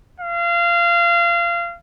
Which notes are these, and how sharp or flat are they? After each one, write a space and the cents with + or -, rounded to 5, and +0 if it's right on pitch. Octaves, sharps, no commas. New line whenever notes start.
F5 -25